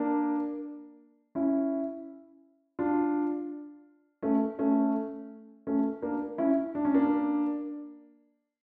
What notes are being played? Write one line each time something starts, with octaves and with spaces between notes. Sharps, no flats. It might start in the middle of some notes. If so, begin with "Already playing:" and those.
Already playing: A#3 D4
C#4 E4
D4 F4
A3 C#4
A3 C#4
A3 C#4
A#3 D4
C#4 E4
D4
C#4
A#3 D4